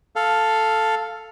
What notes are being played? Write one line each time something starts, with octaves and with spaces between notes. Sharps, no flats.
A4 F5